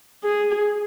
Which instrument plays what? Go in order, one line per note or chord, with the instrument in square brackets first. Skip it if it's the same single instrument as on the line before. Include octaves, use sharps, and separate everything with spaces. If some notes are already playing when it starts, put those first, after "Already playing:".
[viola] G#4